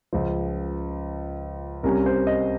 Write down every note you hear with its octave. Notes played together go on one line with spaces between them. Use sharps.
C#2 C#3 F3 C5
C2 C3 G3 C#4 A#4
C5
D#5